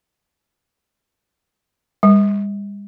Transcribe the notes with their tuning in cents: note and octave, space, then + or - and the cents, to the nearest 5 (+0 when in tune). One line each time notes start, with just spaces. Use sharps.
G3 +45